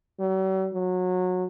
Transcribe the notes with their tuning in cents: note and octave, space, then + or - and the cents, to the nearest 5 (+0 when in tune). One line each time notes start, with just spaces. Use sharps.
F#3 +45
F#3 -20